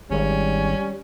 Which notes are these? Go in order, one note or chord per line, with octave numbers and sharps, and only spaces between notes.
G#1 G3 C#4